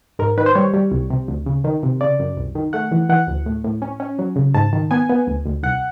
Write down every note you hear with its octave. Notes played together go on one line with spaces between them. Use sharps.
G#2 A#4
D#3 B4
C5
G3 C#5
G3
C2
C3
D2
C#3
D#3
C3
C#3 D5
F#2
C2
D#3
A3 F#5
E3
E3 F#5
D2
A2
A2
C#4
C#4
F#3
C#3
G#2 A5
D#3
B3 G#5
B3
D2
D2
C2 F#5